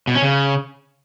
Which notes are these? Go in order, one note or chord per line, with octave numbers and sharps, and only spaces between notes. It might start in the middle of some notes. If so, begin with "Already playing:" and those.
B2
C#4
C#3